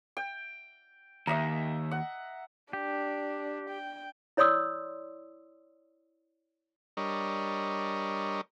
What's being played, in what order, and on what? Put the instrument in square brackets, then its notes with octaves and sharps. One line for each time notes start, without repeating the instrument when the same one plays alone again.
[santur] G5
[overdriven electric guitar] D#2 [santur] D#5 E5 A#5
[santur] F#5
[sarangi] D4 [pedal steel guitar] G4
[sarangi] G5
[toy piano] E4 C#5 D5 C6 D#6 E6
[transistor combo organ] G3 D4 A#4 C#5 D#5